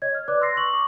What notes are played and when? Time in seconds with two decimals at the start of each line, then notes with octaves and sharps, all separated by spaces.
0.02 C#5 D#5 G#6
0.15 F6
0.28 B4 D5 D6 F#6
0.41 C6 E6 A6 A#6 C7
0.57 C#6 F#7
0.73 C#6 D6 E6